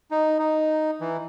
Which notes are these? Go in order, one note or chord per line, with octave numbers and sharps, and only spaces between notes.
D#4
D#4
E3